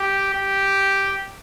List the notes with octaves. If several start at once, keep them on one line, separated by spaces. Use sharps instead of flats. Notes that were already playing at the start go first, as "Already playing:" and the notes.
Already playing: G4
G4